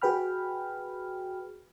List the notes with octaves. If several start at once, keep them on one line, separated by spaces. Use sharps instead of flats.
F#4 G#4 B4 G5 B5 F6